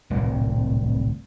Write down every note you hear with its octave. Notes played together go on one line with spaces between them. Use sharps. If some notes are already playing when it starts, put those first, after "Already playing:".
D1 C2 A#2 G3